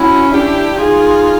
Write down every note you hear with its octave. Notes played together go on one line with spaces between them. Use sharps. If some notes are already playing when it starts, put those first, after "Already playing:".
Already playing: C#4 E4 F#4
D4 E4 G4
D#4 F4 G#4